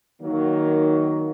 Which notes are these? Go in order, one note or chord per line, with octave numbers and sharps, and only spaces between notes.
D#3 F#3 A#3